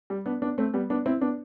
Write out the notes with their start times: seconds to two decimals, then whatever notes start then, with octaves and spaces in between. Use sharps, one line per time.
0.10 G3
0.26 B3 D4
0.42 B3 D4
0.58 A3 C4
0.74 G3 B3
0.90 B3 D4
1.06 C4 E4
1.21 B3 D4